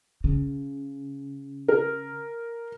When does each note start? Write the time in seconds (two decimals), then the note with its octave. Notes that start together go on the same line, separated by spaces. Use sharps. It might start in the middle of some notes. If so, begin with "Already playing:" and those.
0.24 C#3
1.68 A#4